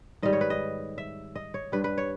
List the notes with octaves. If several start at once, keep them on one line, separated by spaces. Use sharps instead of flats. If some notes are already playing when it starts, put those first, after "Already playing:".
G#2 D#3 G3 D#5
C#5
B4
D#5
E5
D#5
C#5
G2 G3 B4
B4
C#5